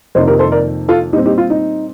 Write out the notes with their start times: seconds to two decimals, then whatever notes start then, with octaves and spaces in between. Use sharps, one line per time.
0.15 F2 C3 D#3 A#3 C5 D#5
0.27 G4 A#4
0.39 A4 C5
0.52 A#4 D5
0.89 F4 A4
1.13 A#2 G3 C4 D#4 G4
1.25 D#4 G4
1.38 F4
1.50 D#4